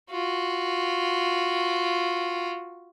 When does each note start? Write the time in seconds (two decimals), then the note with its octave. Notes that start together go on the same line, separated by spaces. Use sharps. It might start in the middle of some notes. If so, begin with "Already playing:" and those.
0.11 F4 F#4